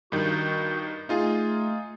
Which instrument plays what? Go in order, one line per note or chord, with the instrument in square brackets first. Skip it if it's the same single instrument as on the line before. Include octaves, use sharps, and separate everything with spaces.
[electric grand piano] G2 D#3 [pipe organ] F#4 G6
[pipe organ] A3 [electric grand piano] D#4 F4 G#4